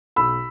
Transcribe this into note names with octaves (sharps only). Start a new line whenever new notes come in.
B1 B5 E6